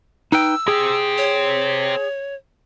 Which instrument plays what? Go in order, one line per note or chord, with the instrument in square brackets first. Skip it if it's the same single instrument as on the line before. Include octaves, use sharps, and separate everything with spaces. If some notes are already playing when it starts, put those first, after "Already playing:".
[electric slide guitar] D#4 B4 G5 [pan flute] E6
[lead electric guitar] C4 G4 [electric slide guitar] G#4
[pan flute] C#5